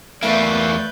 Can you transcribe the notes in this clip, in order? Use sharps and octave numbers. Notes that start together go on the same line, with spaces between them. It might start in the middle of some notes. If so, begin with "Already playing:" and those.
E2 A3 A#3 B4 D5 E5 G6